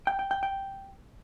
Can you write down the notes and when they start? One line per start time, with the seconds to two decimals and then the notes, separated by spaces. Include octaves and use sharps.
0.07 G5
0.19 G5
0.31 G5
0.43 G5